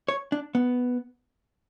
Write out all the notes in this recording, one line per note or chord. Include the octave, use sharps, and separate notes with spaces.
C#5
D4
B3